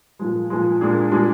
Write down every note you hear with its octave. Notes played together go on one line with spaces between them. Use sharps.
A#2 F3 G#3
A#2 F3 G#3
A#2 G#3 D4 G#4
A#2 G#3 D4 G#4